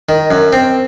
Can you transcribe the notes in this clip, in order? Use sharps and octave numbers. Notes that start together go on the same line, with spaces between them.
D#3
F#2
C4